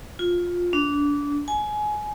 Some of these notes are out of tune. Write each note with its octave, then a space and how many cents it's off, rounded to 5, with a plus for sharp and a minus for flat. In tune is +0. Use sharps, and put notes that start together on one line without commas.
F4 +15
D4 -25
G#5 +20